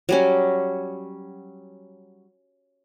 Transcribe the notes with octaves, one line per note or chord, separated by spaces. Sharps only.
F#3 G3 C#4